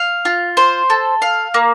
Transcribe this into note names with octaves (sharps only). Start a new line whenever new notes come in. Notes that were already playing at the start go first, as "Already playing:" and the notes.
Already playing: F5
F4
C5
A4
F5
A#3